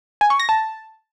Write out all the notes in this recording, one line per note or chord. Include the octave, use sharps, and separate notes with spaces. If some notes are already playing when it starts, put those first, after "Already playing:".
G#5
C#6
A#6
A5